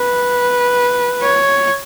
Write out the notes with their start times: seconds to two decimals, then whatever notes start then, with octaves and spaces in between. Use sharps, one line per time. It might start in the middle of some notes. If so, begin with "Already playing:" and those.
Already playing: B4
1.22 C#5